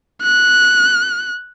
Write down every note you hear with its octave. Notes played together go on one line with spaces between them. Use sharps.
F#6